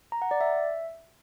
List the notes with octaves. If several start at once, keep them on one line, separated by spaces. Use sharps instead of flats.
A#5
F#5
D5
E5